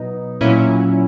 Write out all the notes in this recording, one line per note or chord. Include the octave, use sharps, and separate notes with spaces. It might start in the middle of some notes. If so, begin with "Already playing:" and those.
Already playing: B2 F#3 B3 D#4
A#2 F#3 C#4 E4